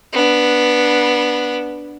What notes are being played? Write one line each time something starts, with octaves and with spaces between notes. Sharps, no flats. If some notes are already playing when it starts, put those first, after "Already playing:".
B3 D4